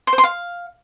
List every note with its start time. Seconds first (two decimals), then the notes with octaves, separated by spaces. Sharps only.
0.07 C6
0.13 C5
0.18 C6
0.24 F5